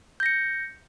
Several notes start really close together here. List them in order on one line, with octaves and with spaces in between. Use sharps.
G6 A#6 C#7